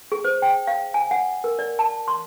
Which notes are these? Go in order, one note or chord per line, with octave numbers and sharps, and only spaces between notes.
G#4
C5
G5
F5
G#5
F#5
A#4
D5
A5
C6